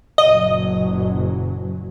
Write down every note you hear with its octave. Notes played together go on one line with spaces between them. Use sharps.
F#1 A#2 F#3 D#5